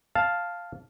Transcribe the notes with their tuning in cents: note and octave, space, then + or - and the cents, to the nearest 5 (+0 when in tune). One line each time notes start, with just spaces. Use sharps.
F5 +0 A5 +0